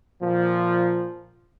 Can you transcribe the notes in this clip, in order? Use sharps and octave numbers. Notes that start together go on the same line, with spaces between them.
A#2 F3